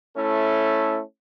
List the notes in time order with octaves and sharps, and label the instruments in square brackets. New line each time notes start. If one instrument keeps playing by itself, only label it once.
[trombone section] A3 C#4 E4 A4